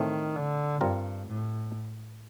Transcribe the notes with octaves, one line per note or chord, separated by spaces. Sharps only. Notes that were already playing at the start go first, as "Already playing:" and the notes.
Already playing: A2 D#3 A3 C4
D3
G2 G3 C4 F4 A#4
A2